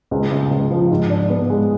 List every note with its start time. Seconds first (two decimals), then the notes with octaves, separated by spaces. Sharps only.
0.11 C#2
0.32 C#3
0.51 C#2
0.70 F3
0.91 G#2
1.10 D4
1.30 B3
1.50 G#3